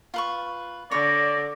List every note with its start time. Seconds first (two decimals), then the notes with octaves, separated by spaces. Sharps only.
0.14 F4 B4 C#6
0.91 D3 C#5 D5 A#6